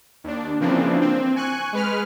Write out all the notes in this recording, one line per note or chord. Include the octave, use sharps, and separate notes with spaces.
D#2 D4
C#3 E3 F3 A#3 C4 D4
C4
G#5 C#6 F#6
G#3 B4 F6